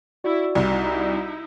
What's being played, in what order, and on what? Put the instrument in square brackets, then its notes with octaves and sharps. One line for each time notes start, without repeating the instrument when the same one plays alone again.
[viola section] E4 [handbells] F#4 D5
[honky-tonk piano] C2 [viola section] D#4 E4